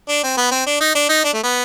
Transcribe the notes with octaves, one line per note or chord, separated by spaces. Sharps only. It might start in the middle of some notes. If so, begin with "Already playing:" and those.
D4
C4
B3
C4
D4
D#4
D4
D#4
D4
A3
B3